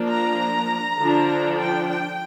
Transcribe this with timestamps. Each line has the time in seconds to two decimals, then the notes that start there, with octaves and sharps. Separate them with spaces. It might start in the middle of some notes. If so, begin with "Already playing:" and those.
Already playing: F3 A#3 D4
0.08 A#5
0.98 D3 F3 D4
1.58 G5
1.86 G5